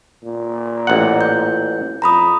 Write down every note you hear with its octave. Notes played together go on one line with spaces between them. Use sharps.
A#2
A1 F#5
G6
F2 A#5 B5 D#6